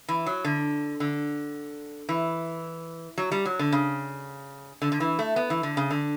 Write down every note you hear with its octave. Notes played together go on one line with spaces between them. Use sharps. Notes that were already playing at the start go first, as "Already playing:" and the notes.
E3
F#3
D3
D3
E3
F#3
G3
F#3
D3
C#3
D3
D3
E3
A3
B3
E3
D3
C#3
D3